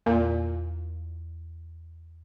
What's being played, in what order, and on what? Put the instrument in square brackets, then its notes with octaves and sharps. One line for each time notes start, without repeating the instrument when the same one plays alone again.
[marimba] E2 [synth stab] A#2